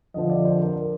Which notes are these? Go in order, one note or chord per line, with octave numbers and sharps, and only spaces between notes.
F2 D3 F3 D#5
D5
C5
A#4
A#4